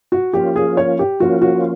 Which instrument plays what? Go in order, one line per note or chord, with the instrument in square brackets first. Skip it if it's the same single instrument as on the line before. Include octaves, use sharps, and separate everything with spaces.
[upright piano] F#4
[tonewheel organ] F3 A#3 C#4 F4 [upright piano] G4
[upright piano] G#4
C#5
G4
[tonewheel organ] F3 A#3 C#4 F4 [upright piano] F#4
[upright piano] F#4